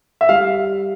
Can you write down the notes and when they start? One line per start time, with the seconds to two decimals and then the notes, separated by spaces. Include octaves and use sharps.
0.21 E5
0.29 G3 F5